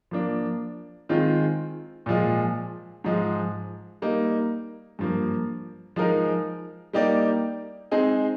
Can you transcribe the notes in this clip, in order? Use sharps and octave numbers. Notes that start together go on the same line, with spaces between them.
F3 A#3 D4
D#3 G#3 C4 F4
A#2 F3 G#3
G#2 F3 G#3
G3 A#3 D#4
G2 F3 A#3
F3 G#3 D#4 A#4
G3 A#3 D#4 G4 D5
G#3 C4 D#4 G#4